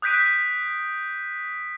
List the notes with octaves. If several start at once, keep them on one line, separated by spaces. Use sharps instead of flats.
D#6 F#6 G6 B6 D7 D#7